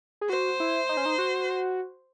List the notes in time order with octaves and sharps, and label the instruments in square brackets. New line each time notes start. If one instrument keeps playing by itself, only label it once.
[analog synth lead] G#4
[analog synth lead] F#4 [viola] C5
[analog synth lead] E4
D#4
C#4
D#4
F#4